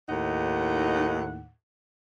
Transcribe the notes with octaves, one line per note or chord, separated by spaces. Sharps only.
D#2 A2 D#4 F#5